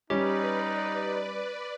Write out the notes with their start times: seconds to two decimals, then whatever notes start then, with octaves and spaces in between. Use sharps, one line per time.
0.10 G3 C#4 D#4 G4 B4 D5